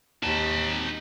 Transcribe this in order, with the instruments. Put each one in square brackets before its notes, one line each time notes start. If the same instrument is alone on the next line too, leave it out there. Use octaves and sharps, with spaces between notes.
[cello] D#2 G4 [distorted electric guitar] D#4 A5